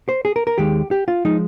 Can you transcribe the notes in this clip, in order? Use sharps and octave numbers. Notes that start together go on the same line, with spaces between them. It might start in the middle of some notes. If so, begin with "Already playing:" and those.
C5
G#4
A#4
A#4
D#2 D#3 G#3 G4
G4
F4
F3 G#3 D#4